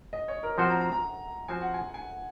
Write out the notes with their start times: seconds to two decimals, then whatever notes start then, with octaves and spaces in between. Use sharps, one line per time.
0.13 D#5
0.28 C#5
0.43 A#4
0.58 F3 C4 F#4 C5 F#5
0.70 A#5
0.81 A#5
0.92 A#5
1.48 F3 C4 F#4 C5 G#5
1.61 F#5
1.74 G#5
1.94 G#5